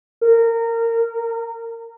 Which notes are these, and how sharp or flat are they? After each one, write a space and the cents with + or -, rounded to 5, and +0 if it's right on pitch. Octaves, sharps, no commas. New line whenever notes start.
A#4 -20